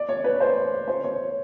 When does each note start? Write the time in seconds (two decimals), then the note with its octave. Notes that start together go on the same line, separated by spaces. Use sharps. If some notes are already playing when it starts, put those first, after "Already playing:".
Already playing: D5
0.09 C#5
0.24 B4
0.40 C5
0.88 C5
1.04 C#5